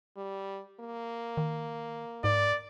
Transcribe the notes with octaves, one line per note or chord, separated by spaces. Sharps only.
G3
A#3
D#3
G#2 D5